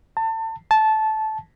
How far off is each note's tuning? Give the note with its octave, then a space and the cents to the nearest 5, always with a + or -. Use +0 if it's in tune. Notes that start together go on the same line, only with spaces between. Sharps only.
A5 +30
A5 -15